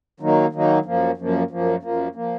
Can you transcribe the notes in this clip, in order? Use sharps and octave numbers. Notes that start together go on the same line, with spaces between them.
D#3 F#3 A#3 D#4
D#3 F#3 A#3 D#4
F#2 F3 A#3
F#2 F3 A#3
F#2 F3 A#3
F#2 F3 A#3
F3 A#3